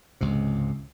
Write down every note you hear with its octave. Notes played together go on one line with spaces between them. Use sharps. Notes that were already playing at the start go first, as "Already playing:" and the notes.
C#2 G#2 C3